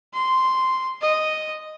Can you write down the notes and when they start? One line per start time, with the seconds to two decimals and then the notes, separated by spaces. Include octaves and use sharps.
0.13 C6
1.01 D#5